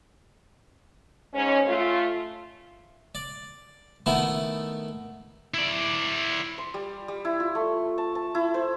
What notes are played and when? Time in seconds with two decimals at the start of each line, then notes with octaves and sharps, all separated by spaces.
1.34 G#2 C#4
1.66 A3 F4
3.15 D5
4.06 D#3 A3 B3 E4
5.54 E4 D5
6.58 C6
6.74 G3
7.08 G3
7.25 E4
7.40 F4
7.55 A3
7.98 A5
8.15 A5
8.35 E4
8.54 C5